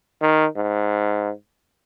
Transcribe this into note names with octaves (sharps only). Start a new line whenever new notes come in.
D#3
G#2